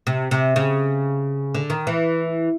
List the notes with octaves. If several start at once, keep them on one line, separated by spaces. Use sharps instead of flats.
C3
C3
C#3
D3
D#3
E3